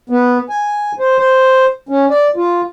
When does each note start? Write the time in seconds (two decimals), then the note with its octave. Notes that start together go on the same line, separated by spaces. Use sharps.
0.10 B3
0.49 G#5
0.99 C5
1.18 C5
1.89 C#4
2.10 D5
2.36 F4